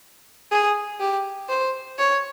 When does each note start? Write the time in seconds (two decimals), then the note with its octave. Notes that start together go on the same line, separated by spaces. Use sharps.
0.51 G#4
1.00 G4
1.49 C5
1.98 C#5